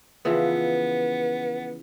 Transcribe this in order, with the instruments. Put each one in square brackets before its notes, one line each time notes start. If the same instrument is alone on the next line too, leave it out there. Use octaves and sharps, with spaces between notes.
[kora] C#3 E3 F3 [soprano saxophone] B3